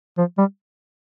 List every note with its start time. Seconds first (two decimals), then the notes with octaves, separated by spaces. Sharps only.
0.18 F3
0.38 G3